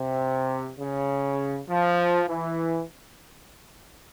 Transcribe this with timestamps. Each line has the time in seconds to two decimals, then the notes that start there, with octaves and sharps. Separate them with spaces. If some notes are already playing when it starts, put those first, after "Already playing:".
Already playing: C3
0.78 C#3
1.68 F3
2.27 E3